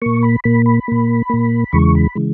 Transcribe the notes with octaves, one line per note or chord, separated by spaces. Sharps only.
A#2 A#3 C#6
B5
A#2 A#3 B5
B5
A#2 A#3
A#2 A#3
E2 C#3 E3 G#3 C#6
B5
C#3 E3 G#3